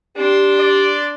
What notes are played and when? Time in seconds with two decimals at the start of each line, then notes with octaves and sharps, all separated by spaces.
0.17 D4 G4 C6
0.60 D5